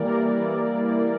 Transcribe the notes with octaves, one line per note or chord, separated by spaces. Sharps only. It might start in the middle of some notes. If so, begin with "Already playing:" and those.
Already playing: E3 G3 A#3 A#4 D5
E3
G3 A#3